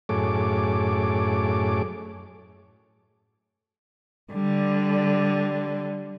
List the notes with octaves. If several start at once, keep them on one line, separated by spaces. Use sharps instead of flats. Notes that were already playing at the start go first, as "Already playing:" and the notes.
F#2 A2 G#4 A4 C#5 D6
D3 G3